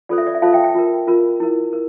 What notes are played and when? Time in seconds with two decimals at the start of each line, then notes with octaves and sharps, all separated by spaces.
0.09 F4 A4 C5 D5
0.18 E5
0.27 D5
0.35 E5
0.42 F4 A4 C5 F5 A5
0.53 E5 G5
0.64 E5 G5
0.75 F4 A#4
1.07 F4 A#4
1.40 E4 A#4
1.73 A#4